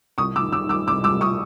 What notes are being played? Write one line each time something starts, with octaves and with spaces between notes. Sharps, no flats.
C2 C#6 D#6
D6 E6
D#3
D6 E6
D#3
D6 E6
C2 D6 E6
D6 E6
C2
C#6 D#6